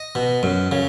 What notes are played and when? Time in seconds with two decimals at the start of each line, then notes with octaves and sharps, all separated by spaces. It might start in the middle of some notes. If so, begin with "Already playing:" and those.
Already playing: D#5
0.15 B2
0.43 F#2
0.72 C#3